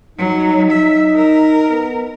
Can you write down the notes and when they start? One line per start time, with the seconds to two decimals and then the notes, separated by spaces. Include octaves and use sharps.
0.18 F#3 D#4
0.71 E5
1.16 A#4
1.70 B3